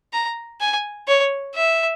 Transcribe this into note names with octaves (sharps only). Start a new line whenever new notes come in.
A#5
G#5
C#5
E5